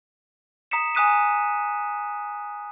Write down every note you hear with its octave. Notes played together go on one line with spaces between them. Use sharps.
A#5 D#6 B6 C#7 E7
G#5 A#5 D#6 F#6 B6 D#7